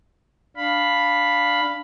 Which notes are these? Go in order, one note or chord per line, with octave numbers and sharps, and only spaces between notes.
D4 F5 B5